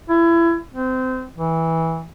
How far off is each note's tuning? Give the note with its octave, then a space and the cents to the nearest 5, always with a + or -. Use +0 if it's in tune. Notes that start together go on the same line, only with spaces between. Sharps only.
E4 +25
C4 -25
E3 -15